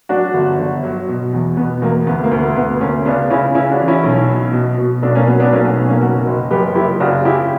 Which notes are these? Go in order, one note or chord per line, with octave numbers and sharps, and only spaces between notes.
F#3 D4 F#4
G1
G1
F#3
B2
E2
B2 B3
E2 A#3
D2 B3
A#3
D2
B3
D2 B3
D2 A#3 C#4
C#3 B3 D4
C#3 C#4 E4
C#3 C#4 E4
D4 F#4
E3
C#4 E4
B1
B2
B2
B2
B1 B3 D4
A#3 C#4
F#3 B3
B3 D4
B1 A#3 C#4
B3
B1 B3
A#3 C#4
F#1 F#4 A#4
F#1
F#2 G4 B4
F#1 E4 G4
C#3 D4 F#4
C#3 E4 G4